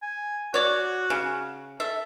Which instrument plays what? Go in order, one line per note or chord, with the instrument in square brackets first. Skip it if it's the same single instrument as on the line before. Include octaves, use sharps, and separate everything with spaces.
[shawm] G#5
[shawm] F#4 [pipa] C#5 D5
[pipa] C#3
[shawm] A4 [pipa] E5